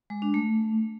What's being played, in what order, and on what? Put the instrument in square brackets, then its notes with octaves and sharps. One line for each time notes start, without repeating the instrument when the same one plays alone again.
[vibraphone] G#3
D4
A3